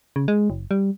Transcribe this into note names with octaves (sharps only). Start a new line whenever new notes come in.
C#3
G#3
F#1
G3